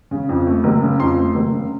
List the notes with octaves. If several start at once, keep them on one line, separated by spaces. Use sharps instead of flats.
C#3
F2
A3
F#1
C#3
F2 C6
A3
F#1
C#3